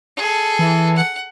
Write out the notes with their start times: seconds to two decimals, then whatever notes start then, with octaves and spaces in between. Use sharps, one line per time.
0.17 G#4 A4
0.59 E3
0.96 F#5